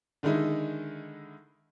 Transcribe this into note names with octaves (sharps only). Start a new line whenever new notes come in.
D3 D#3 G#3 D#4 E4